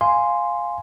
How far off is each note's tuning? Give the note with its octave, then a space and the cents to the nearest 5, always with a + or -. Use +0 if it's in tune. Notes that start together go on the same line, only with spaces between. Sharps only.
F5 +0 G#5 +0 C6 -5